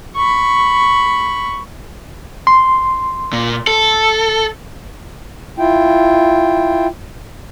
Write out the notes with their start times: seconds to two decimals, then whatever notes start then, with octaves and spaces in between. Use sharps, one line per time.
0.16 B5 C#6
2.47 C6
3.33 A#2
3.67 A4
5.58 E4 F4 G5